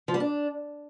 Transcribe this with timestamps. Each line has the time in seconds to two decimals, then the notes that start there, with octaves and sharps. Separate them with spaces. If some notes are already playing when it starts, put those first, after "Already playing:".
0.08 F3
0.14 G3
0.20 D4